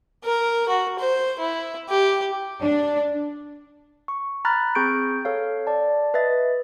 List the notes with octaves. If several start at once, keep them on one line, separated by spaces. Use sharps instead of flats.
A#4
F#4
C5
E4
G4
D4
C#6
A#5 B5 F6 F#6 A6
C4 G#4 C#6 G6 D7
A4 C#5 F5
D5 A5
B4 D#5 E5 A6